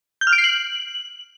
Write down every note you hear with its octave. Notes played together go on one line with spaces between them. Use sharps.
G6
F6
D7
C7
F#7